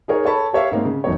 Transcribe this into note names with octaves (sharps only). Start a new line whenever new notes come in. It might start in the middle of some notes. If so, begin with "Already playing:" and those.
D#4 G#4 A#4 C#5
A4 C#5 A5 B5
G4 C#5 E5 F5
G#2 A#3 C4
C#3
E1 F#2 D#4 C#5